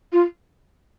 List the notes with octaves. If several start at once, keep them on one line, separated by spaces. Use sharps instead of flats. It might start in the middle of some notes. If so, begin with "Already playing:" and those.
F4